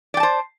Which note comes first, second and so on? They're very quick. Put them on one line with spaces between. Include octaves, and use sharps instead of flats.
D5 G5 A5 C5